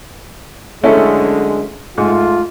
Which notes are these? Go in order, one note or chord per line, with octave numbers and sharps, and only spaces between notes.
F#2 D3 G#3 A3 C#4 E4
G#2 A3 F4